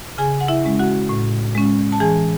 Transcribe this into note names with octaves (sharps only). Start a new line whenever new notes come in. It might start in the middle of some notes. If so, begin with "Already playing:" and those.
C#3 G#4 G#5
F#5
E4 E5
G#3 C#4
F#4 F#5
A2
G#3 C#4
A5
E3 G#4 G#5